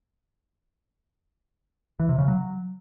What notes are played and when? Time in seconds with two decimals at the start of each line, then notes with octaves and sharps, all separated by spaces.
2.00 E3
2.09 C3
2.18 C#3
2.28 F#3